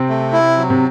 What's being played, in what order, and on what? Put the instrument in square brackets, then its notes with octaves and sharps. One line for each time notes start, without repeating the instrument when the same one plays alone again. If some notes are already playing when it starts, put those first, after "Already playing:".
Already playing: [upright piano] C3 C4
[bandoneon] A3
E4
F#3
[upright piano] C3